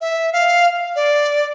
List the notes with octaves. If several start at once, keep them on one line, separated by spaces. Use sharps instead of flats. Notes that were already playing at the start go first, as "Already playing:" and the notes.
E5
F5
D5